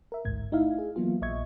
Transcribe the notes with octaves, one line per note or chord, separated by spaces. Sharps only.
A#4 E5
A1 D2 G#2 G#6
A3 D#4 E4 E5 F5
G#4
E3 F#3 A#3 B3 F4
A#1 A#2 D#5 E5 C#6 G#6